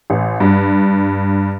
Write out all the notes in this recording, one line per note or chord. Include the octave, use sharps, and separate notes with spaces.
A1
G2